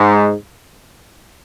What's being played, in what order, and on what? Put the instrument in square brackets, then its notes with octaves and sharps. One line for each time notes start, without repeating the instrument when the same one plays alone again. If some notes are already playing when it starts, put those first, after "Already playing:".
Already playing: [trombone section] G#2